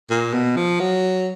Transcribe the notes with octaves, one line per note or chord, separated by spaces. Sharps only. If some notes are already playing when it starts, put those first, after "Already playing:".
A#2
B2
F3
F#3